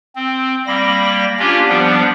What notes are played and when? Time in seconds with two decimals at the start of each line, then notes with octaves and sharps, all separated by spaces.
0.16 C4
0.67 G3 A#3 B5 A#6
1.39 A#3 C#4 D4 F4 G4
1.69 F3 G3 B3 D4